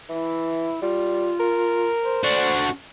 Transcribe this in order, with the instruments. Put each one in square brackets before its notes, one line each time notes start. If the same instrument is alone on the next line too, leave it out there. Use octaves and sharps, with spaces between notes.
[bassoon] E3 [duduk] E4
[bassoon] G3 [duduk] F4
[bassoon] A#4
[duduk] C5
[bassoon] D3 [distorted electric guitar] D4 F#4